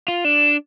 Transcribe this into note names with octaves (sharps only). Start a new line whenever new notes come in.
F4
D4